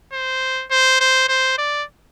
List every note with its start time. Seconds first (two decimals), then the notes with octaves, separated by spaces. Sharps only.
0.13 C5
0.71 C5
1.01 C5
1.29 C5
1.58 D5